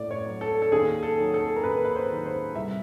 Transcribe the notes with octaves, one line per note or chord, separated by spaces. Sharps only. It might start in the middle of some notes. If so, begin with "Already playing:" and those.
Already playing: A2 D5
C#5
F#3
A4
A4
D#2 G#4
A4
D#3 F#3
A4
A#4
D#2 B4
B4
C5
D#3 F#3
C5
C2 E5